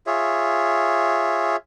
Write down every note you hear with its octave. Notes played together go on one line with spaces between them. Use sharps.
F4 G#4 C#5 E5